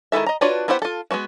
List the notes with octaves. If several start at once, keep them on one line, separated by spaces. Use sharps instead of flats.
D#3 G#3 E4 A4 E5
D#5 A#5
D4 F4 F#4 B4 C#5
B3 E4 G4 C5 F#5
F4 A4
G#3 B3 C4 F#4